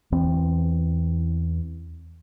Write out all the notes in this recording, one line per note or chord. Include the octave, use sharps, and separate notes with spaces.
E2 E3 C4